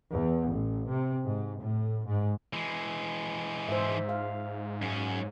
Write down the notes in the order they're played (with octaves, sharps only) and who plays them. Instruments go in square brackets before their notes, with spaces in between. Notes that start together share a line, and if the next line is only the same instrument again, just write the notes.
[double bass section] E2
A1
C3
G#2
A2
G#2
[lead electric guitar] E3 G#3
[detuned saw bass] G#2 [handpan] C5 E5
[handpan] F5
[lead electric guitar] F#2 C#4